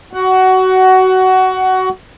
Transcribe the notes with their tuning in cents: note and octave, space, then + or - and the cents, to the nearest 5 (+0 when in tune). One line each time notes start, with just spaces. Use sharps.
F#4 +20 F#5 +15